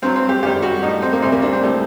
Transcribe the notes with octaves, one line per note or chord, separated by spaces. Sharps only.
G2 F#3 C4
C4
G4
F#2 D#3 G3 G4
F#4
A2 G3 D#4
C4
A#3
D2 C3 G3 C4
A#3
D4
C4
A2 G3